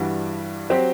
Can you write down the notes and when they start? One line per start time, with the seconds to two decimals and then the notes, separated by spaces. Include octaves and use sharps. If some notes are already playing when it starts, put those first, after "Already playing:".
Already playing: G2 E3 G3 D4 F#4
0.70 F#3 C4 G4 C5